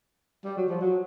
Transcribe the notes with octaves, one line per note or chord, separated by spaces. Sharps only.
G3
F#3
F3
F#3